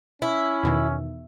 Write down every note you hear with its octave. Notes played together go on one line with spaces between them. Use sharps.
C#4 E4
E2 B2 D#3